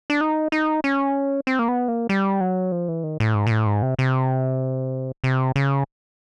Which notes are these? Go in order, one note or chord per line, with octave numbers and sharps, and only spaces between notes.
D4
D#4
D#4
C#4
C4
A#3
B3
A#3
G3
F#3
F3
E3
D#3
A2
G#2
A#2
A2
G#2
C3
C3
C3
C#3